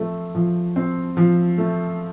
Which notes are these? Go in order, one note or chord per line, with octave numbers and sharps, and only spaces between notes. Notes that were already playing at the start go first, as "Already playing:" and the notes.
Already playing: F3 A3 C4
F3
C4
F3
A3